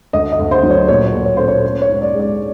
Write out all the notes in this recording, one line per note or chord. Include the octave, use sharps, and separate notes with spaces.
D2 D#5
D#5
D2
C5
F#3
C#5
A#2 C#5
A#2
C#5
A3 C5
C#5
C#4
C#5
G#2
D5
G#3
D5